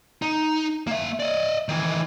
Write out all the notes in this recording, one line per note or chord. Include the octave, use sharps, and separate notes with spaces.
D#4
A#3 E5
D5 D#5
D#3 E3